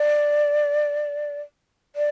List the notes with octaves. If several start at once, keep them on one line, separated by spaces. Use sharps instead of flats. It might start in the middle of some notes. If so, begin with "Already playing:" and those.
Already playing: D5
D5